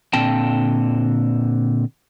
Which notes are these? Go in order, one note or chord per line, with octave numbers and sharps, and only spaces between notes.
A#2 D3 C4 G5 A5